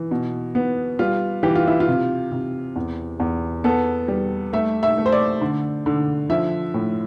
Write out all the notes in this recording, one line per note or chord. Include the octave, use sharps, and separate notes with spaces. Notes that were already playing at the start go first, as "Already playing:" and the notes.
Already playing: E3
B2
B3
G3 F4
E3 G4
F4
E4
F4
C3
C3
E2
E2
B3 A4
G3
A3 E5
E5
A3
C5
D5
D3
D3
F3 E5
A2